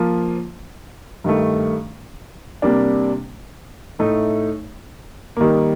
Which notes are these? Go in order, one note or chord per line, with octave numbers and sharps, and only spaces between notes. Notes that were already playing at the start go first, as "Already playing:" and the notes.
Already playing: F3 A#3 F4
G2 D#3 A3
C3 G3 A#3 D4
A2 A3 D#4
D#3 G3 A#3